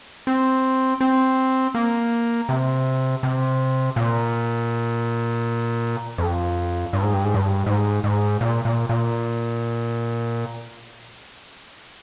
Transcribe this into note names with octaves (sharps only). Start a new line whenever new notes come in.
C4
C4
A#3
C3
C3
A#2
F2
G2
G#2
G2
G#2
G2
G#2
G#2
A#2
A#2
A#2